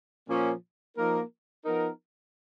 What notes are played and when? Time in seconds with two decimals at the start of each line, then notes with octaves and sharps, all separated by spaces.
0.27 A#2 F3 A#3 C#4
0.97 F3 A#3 D#4 A#4
1.65 F3 B3 D#4 A#4